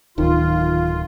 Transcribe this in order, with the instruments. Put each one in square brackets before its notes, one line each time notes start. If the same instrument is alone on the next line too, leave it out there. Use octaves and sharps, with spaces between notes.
[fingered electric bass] D1 [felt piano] D#3 [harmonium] F4